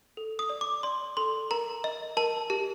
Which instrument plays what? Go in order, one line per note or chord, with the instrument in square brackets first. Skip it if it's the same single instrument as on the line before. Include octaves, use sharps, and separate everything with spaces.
[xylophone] A4
D#6
D5
D6
D5 C6
A4 C6
A#4 A#5
D#5
A#4 A5
G4